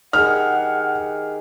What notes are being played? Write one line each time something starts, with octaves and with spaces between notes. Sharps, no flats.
D#3 G4 G#4 F#5 F6